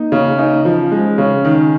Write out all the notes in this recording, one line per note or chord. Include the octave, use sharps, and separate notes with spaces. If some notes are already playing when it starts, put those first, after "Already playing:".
Already playing: A#3 D#4
C#3
C#4 D#4
F3
G#3
C#3
D#3